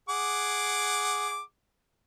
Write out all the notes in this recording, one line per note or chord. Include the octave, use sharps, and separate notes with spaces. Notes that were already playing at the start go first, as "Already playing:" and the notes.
G#4 F#5 D6